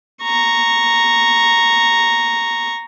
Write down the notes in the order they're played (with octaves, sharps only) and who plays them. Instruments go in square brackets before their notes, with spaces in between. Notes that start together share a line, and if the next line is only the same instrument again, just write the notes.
[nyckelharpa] A#5 C#6